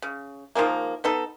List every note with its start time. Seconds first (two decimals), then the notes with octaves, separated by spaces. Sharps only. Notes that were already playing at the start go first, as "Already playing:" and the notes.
0.02 C#3
0.55 D#3 F3 G#3 A#3
1.04 B3 D#4 A4